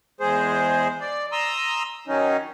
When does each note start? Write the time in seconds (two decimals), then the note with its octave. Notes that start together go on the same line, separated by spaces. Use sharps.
0.21 E2 G#3 G#4 C5
1.01 D5
1.32 A#5 C6 D#6 E6
2.08 D#3 F#3 C#4 D#4